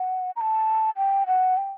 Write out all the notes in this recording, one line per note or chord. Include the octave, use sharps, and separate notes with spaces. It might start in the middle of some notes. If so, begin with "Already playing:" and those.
Already playing: F#5
A#5
A5
G5
F#5
G5